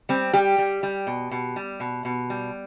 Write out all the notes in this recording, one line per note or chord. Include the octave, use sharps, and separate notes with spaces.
G3 C4
G3 G4
G3
G3
B2
B2
G3
B2
B2
G3